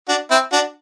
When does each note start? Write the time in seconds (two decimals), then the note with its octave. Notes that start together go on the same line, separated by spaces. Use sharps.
0.08 D4 F#4
0.30 C4 E4
0.52 D4 F#4